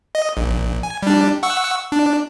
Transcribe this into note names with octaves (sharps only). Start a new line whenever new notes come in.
D#5
A#1
G#5
G3 D4
F#5 C#6 E6
D4